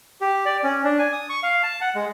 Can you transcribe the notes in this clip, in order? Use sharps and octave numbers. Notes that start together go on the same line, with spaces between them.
G4
D5
C#4
D4
G#5
D#6
C#6
F5
A5
F#5
G#3